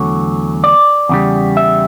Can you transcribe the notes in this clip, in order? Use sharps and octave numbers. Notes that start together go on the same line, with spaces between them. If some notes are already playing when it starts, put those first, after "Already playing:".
Already playing: E2 D3 F#3 A3 C#5
D5
E2 C#3 G3
E5